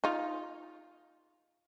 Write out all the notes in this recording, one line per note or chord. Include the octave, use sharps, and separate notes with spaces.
D#4 F4